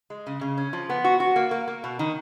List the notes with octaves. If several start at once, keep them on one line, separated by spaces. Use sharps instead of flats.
G#3
C#3
C#3
C#4
F3
B3
F#4
F#4
A#3
A#3
A#3
B2
D#3